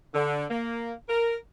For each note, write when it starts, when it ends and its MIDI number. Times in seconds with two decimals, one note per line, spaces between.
0.14 0.45 50
0.50 0.93 58
1.09 1.36 70